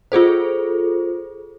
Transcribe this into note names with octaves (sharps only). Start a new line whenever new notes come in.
F4 G#4 A4 C5